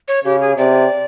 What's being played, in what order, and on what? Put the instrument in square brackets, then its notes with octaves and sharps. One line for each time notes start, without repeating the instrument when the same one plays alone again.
[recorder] C#5
[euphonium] C#3 [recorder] G4
[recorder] G#4
[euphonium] C3 [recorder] D5